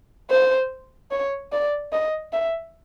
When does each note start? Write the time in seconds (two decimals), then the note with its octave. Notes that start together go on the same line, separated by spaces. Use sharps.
0.30 C5
1.12 C#5
1.52 D5
1.93 D#5
2.33 E5